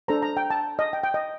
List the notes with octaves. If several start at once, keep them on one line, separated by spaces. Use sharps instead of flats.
D4 A4 C5 A#5
A#5
G5
A5
D#5
G5
G5
D#5